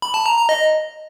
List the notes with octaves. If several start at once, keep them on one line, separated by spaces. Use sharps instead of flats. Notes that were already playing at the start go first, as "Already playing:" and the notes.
B5
A5
A#5
A#5
D#5